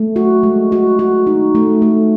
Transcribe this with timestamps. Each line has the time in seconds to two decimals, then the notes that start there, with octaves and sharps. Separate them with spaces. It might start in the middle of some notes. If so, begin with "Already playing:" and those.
Already playing: A3
0.16 F#4
0.43 G#3
0.72 F#4
0.99 F#4
1.27 D#4
1.55 A3
1.82 A3